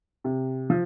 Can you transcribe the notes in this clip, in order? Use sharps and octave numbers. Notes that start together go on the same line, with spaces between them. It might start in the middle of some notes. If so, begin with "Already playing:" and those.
C3
F3